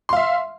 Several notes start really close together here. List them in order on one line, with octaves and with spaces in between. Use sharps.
C6 F5 E5